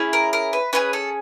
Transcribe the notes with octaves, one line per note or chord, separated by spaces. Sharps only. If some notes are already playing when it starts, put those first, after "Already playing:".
Already playing: C#4 E4 G#4
A#4
A#4
B4
C#4 E4 G#4 B4
A4